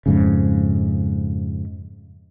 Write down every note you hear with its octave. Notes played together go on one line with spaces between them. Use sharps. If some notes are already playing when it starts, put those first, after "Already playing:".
F2 G#2 C#3